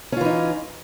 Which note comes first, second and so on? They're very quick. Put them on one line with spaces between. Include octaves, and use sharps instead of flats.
C#4 F4 E3 D#4